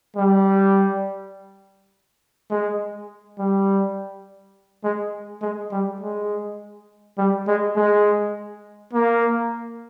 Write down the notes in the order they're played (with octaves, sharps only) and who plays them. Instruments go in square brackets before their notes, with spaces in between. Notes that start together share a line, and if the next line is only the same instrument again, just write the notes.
[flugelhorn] G3
G#3
G3
G#3
G#3
G3
G#3
G3
G#3
G#3
A#3